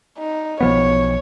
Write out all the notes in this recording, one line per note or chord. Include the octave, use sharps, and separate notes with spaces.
D#4
B1 F3 B3 C#5